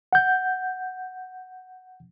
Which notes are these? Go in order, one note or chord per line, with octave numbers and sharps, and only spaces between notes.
F#5 G6